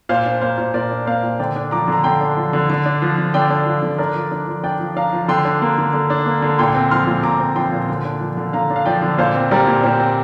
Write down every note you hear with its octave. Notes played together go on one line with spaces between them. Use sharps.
A#2 C5 F5
D4
A#3 C5 F5
A#2
A#2 A#4 D5
D4
A#3 C5 F5
A#2
D3 D5 G5
D4
F3 A#5 D6
D3 A#5
D3 G5 C6
D4
F3
D3
D3
D4
F3
D3
D3 D5 G5
D4
F3
D3
D4 A#4 D5
F3
D4
F3
D4 D5 G5
F3
D4 F5 A#5
F3
D3 G5 C6
D4
A#3
D3
D3
D4
A#3
D3
A#2 G5 C6
C4
F3 C6 F6
A#2
A#2 A#5 D6
C4
F3 G5 C6
A#2
D3
D4
F3
D3
D3 F5 A#5
D4
F5
F3 D5 G5
D3
A#2 C5 F5
C4
G3 A#4 D5
A#2
A#2 G4 C5
C4